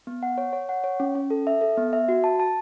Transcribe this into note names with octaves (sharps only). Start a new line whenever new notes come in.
B3
F#5
C#5
C#5
F#5
C#5
C#4
C#4
A4
E5
A4
B3
E5
F#4
A5
A5